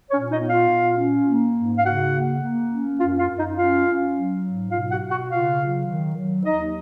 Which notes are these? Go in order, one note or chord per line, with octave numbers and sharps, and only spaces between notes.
A#2 C#4 C#5
D#4 D#5
B3
F4 F5
A#2
C#4
A#3
G#2
F5
C#3 F#4 F#5
A#3
A#3
C#4
F#2 F4 F5
F4 F5
F#2
D#4 D#5
C#4 F4 F5
C#4
F#3
G#2
B2 F4 F5
F#4 F#5
B2
F#4 F#5
C#3 F4 F5
F#3
D#3
F#3
D#2 D#4 D#5